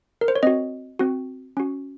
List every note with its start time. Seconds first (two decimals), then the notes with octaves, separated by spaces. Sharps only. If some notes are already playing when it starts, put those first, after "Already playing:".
0.21 A#4
0.28 C5
0.36 C#5
0.43 C4 F#4 D#5
0.99 C4 F#4
1.57 C#4 F#4